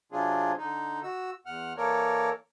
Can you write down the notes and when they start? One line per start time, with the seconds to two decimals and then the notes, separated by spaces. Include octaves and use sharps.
0.12 C3 F#3 C4 D4 F4 G#4
0.58 D3 D#4
1.03 F#4 E6
1.46 E2 F#5 F6
1.77 E3 A#3 A4 A#4 C#5 D5